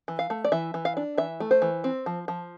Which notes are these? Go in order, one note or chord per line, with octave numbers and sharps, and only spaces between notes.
E3
F5
A3
D5
E3 E5
E3
F5
D4
E3 E5
A3
C5
E3
C4
F3
F3